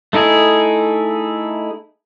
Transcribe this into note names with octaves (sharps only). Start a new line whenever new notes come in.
A3 D#4 E4 G#4